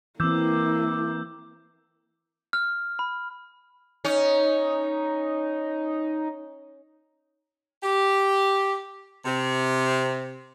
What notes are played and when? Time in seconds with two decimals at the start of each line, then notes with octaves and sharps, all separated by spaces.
0.20 E3 A#3 C4 E4 D6 E6 G6
2.53 F6
2.99 B5
4.05 C#4 D#4
7.82 G4
9.25 C3